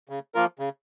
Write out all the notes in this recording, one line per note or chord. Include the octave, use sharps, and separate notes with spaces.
C#3
F3 A#3 F4 A#4
C#3